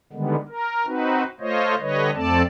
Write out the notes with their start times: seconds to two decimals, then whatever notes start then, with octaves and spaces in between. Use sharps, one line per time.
0.13 D3 D#3 G3 G#3 B3
0.48 A#4
0.86 C4 D#4 F#4 B4
1.40 A3 F4 C5 C#5 D#5
1.80 D3 G3 B4 C#5 D#5
2.15 F2 A3 C4 A4 D5 A5